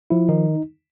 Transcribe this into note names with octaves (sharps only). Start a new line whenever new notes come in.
F3 E4
D#3 D#4